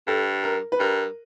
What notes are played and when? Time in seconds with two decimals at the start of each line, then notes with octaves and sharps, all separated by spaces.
0.07 G2 A4
0.44 A#4
0.72 B4
0.80 G2 A#4